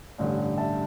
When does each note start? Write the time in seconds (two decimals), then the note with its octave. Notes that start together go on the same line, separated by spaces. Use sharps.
0.18 A1 G2 D3 G3
0.58 E5 A5